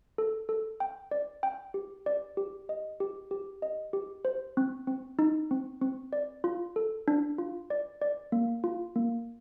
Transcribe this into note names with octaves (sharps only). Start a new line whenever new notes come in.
A4
A4
G5
D5
G5
G4
D5
G4
D#5
G4
G4
D#5
G4
C5
C4
C4
D#4
C4
C4
D5
F4
A4
D4
F4
D5
D5
A#3
F4
A#3